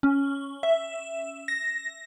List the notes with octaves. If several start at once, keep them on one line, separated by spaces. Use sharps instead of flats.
C#4
E5
A#6